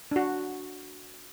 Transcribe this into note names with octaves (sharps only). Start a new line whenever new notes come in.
D4 F#4